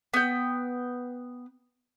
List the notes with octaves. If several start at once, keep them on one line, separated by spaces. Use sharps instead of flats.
B3 G5